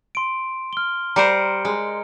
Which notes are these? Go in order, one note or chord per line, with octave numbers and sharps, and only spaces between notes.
C6 D7
F6 G7
G3 A#4 C5 A#5 C#7 D7
G#3